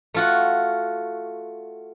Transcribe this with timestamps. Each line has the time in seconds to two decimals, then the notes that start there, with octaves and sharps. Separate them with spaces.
0.14 A3 F4 F#4